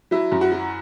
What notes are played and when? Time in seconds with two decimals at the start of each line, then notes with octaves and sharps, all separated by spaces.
0.11 F#3 E4
0.32 F#2
0.41 F#4
0.52 F#3